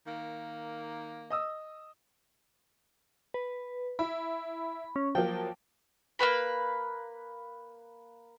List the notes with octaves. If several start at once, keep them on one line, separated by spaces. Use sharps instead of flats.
D#3 A#3
D#5 D#6 E6
B4
E4 B5
C#4
F3 F#3 A#3 G5
A#3 B3 B4 B5